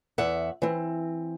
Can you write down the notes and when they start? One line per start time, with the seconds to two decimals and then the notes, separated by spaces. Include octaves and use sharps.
0.18 E2 E5 F#5
0.62 E3 C4